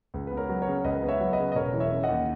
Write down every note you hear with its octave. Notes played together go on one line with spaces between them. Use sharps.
C#2
B3 B4
A#4 C#5
F#3
A#4 C#5
C#3
C#2 B4 D#5
B3
C#5 E5
F#3
B4 D#5
C#3
D#5
E1 A#4 C#5
E3
C#5 E5
C#3
D#5 F#5
D#2